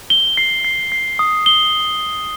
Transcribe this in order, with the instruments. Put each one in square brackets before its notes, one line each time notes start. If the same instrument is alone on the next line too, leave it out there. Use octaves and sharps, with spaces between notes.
[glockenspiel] G7
C7
C7
C7
D#6
G7